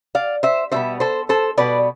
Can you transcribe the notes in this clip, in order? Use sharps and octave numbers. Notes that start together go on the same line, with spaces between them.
D5 F5
C5 E5
B2 G3 B3 C5 E5
A4 C5
A4 C5
B2 G3 B3 B4 D5